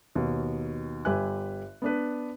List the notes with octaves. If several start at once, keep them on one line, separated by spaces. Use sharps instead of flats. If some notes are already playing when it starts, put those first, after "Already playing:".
D#2 B2
G1 G4 B4 E5 G#5 F#6
B3 D4 B4